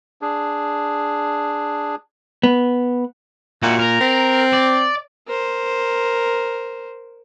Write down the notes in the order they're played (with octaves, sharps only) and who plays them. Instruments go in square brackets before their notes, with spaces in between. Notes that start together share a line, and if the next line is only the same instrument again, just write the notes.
[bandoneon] D4 G#4
[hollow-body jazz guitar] B3
[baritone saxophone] A#2 [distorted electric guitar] E4 F#4
[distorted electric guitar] A#4
[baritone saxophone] C4
[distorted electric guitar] D5
[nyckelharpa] A#4 C5